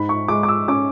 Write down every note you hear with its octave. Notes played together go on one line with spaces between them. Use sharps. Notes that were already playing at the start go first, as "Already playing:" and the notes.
Already playing: G#2 B5
C#6
G#3 D6
D6
E6
C#4 D6